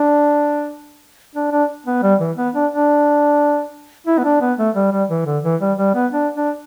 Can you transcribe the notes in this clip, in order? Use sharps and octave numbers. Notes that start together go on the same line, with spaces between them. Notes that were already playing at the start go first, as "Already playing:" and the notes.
Already playing: D4
D4
D4
B3
G3
E3
B3
D4
D4
E4
B3
D4
B3
A3
G3
G3
E3
D3
E3
G3
G3
B3
D4
D4